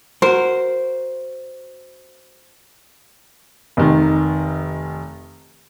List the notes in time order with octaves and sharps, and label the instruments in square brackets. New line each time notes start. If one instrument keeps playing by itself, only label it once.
[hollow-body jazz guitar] F#4 A#4 [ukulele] C5
[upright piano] F1 D#3